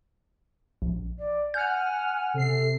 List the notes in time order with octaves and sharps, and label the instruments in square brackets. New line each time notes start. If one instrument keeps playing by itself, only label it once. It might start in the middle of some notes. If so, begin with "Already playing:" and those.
[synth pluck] A#1
[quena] D5
[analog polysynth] F#5 F6 [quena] G#5 [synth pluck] G6
[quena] G#5
[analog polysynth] C3 C7 [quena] A4